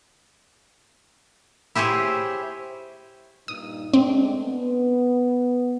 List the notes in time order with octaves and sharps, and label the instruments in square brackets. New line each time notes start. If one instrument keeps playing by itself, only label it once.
[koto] E4 G4 G#4 C5 C#5
[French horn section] G2 A#2 D#4 [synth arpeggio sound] D#6
[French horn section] G#3 A3 D4 [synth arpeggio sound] C4
[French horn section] B3